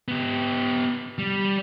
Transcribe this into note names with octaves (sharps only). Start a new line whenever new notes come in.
B3 G4
G3